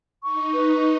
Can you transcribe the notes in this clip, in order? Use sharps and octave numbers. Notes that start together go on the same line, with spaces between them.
D#4 C#6
B4